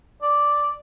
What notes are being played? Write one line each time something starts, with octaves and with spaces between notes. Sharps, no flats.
D5